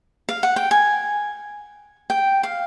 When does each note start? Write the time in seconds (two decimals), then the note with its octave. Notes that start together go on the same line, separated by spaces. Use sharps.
0.29 F5
0.43 F#5
0.56 G5
0.71 G#5
2.10 G5
2.43 F5